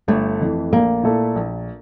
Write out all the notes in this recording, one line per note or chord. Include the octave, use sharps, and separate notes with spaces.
G1 A3
F2 E3
A#1 A#3
A#2 A3 E4 A4
A#1